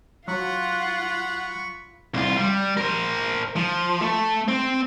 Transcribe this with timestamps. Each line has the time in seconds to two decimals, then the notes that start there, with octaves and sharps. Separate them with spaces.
0.28 F#3 F4 F#5 B5 C#6
2.14 C2 F4
2.37 G3
2.77 A#4 C5
3.56 F3
4.02 A3
4.48 C4